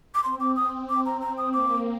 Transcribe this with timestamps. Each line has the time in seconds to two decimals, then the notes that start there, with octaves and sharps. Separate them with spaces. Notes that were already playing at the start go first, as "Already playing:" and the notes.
0.15 D6
0.24 C4 C6
0.40 D6
0.56 D#6
0.90 D6
1.06 A#5
1.21 A#5
1.38 D#6
1.53 A#3 D6